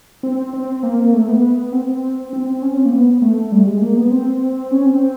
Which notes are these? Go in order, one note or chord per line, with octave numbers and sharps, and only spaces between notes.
C4
C4
A#3
A3
B3
C4
C4
C#4
C4
A#3
B3
A3
G3
G#3
A#3
B3
C4
C#4
C4